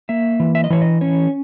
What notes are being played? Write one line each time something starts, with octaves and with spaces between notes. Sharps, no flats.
A#3 E5
E3
E5
D#5
E3 C#5
D#5
C#4 C#5